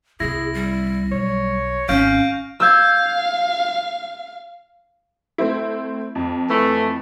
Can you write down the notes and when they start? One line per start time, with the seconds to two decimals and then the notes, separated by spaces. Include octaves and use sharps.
0.20 C2 C3 E4 G#4 A#6
0.54 G3
1.12 B1 C#5
1.89 G#1 C#4 F5 C#6 G6 D7
2.60 F5 E6 G6 G#6
5.38 A3 C4 E4
6.15 F2
6.49 E3 A3